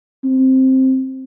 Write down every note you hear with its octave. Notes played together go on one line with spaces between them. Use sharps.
C4